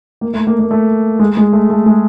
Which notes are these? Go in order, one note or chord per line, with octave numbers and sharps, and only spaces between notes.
A#3
A3
A#3
A#3
A3
G#3
G#3
A3
A3
G#3